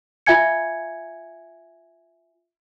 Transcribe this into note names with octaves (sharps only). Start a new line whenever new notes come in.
F4 E5 F5 G#5 G#6 C#7